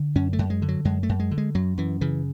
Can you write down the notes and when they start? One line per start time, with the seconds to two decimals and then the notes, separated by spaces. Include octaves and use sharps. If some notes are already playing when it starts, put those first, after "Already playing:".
Already playing: D3
0.15 F#2 C#4
0.33 A3
0.39 F#2
0.50 G#3
0.62 D3
0.68 F#3
0.85 F#2 G#3
1.03 A3
1.09 F#2
1.20 G#3
1.31 D3
1.38 G#3
1.55 F#2 F#3
1.78 F#2 E3
2.01 C#3 E3